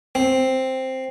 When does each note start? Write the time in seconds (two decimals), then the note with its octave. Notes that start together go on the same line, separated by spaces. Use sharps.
0.15 C4